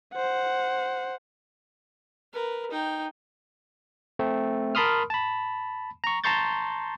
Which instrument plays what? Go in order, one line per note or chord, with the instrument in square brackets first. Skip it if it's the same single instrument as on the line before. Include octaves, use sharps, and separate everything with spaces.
[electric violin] C5 F#5
[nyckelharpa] A#4 B4
D#4 G5
[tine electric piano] A3 C4
A#4 A5 B5 C6 D#6 F6
A5 B5
A#5 C#6
A5 A#5 C6 C#6 G6 A6